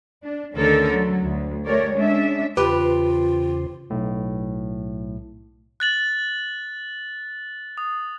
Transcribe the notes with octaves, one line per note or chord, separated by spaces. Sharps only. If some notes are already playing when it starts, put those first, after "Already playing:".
D4
D2 D3 D#3 C#4 A4 A#4
F#3
D2
A3 G4 A#4 C#5 D5
G#3 C#4 D4 E5
E2 C#3 F4 G4 B4 C5
B1 A2
F#6 A6 F#7
D#6